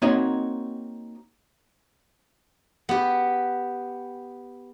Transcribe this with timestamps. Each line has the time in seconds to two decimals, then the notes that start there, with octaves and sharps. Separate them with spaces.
0.02 A#3 C4 D#4 F#4 C#5 D#5
2.89 B3 G4